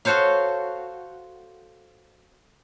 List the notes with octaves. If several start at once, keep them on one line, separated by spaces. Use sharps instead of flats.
F#4 A4 C5 C#5 F5